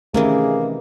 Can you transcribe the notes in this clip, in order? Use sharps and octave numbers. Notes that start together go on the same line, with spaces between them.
C3 D#3 E3 A3 A#3 C#4 G#4